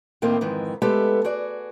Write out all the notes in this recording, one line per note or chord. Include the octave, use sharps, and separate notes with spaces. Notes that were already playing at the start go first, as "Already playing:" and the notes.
A2 D#3 A#3 C4
F2 G#2 D#3 E3
G#3 A3 B3 G4 A4
F#4 G#4 D5